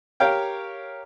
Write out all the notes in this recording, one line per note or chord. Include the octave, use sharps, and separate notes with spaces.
G4 A#4 C#5 F5 G5